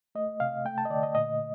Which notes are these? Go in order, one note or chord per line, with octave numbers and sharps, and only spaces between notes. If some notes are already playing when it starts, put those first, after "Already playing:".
A3 D#5
C3 F5
A3 G5
A5
D#5
D3 D5
D#5
A#2 D#5